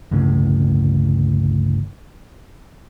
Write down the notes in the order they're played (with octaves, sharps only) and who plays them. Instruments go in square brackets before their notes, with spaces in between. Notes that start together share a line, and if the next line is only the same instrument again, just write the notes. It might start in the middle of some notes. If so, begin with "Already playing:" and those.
[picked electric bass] G1 C#2 A2 C#3